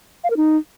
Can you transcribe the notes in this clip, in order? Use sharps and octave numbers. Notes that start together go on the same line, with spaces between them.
F5
A#4
D#4